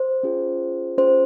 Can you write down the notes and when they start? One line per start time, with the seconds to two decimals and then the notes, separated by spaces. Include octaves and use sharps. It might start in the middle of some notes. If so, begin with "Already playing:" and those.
Already playing: C5
0.23 C#4 F4 G#4
0.98 C#4 F4 G#4 C5